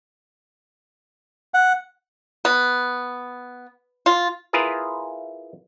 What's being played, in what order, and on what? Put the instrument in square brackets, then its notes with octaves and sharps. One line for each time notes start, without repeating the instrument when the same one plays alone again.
[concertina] F#5
[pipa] B3
F4
[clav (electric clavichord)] E4 F4 G#4 A#4 B4